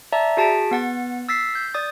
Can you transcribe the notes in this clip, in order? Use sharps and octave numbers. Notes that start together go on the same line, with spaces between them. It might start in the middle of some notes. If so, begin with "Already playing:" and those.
D5 E5 A5 A#5
F#4 G#4 A5 A6 B6 D7
B3 F#5 A6
E6 A6 B6 C7
G6
D5 D#6 A6